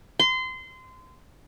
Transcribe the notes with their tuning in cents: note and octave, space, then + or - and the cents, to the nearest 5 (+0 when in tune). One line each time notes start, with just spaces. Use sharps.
C6 -25